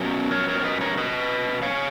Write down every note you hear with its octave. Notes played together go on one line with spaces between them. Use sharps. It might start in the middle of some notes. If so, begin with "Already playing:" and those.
Already playing: B2 F#3 C#4 A#4 C#5
A#4 C#5
A#4 C#5
C#5
B4 D#5
A#4 C#5
B4 D#5
C#5 F5